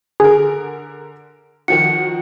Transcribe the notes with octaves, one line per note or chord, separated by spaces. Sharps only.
D3 G#4 A#4
D#3 F3 F#4 C#7